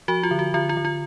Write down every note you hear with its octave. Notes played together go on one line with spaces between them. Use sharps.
F3 F#4
F4
D3
F#4
D3 F4
F4
D3
F4